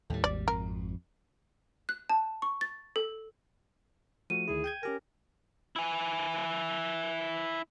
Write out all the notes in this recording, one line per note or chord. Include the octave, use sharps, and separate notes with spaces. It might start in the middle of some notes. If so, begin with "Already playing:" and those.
D#2 A2 G3
G#1 D5
F2 A#4
F#6
A5
C#6
A6
A4
F3 A3 F#4 D#7
D2 D#3 E4 G#4
G5 G6 G#6
C#4 G4 A#4 G#5
E4 G#5